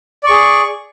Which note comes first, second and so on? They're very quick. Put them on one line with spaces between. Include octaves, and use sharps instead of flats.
D5 C#6 G#4